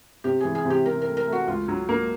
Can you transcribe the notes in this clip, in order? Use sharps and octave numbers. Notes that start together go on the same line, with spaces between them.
C3 G4
E3 G#4
G#4
C3
G4
C3 A#4
A#4
A3
A#4
A3
F#4
C#2 F4
F#3
A#3